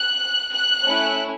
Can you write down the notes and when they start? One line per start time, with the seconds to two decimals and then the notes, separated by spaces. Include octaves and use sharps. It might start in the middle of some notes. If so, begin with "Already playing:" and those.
Already playing: F#6
0.52 F#6
0.84 A3 C#4 E4